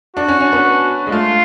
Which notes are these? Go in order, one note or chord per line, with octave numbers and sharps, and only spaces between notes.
D4 F#4
C#4
C#4
B3
G#3
A3 F4